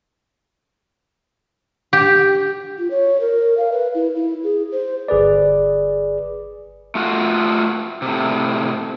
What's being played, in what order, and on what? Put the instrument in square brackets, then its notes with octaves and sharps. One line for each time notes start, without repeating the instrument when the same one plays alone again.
[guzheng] G4
[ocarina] F4
C#5
A#4
F5
B4
E4
E4
G#4
C5
[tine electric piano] G1 G#4 B4 D5
[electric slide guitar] A3 F4 F#4
A2 C3